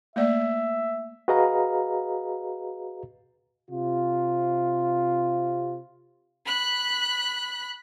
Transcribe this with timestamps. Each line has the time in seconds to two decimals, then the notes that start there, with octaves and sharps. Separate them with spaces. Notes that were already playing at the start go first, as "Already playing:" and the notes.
0.16 A3 A#3 D5 E5
1.28 F#4 G#4 B4 D#5 F5 A#5
3.71 C3 F4
6.46 B5 F#6